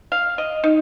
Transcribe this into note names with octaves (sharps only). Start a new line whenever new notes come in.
F5
D#5
D#4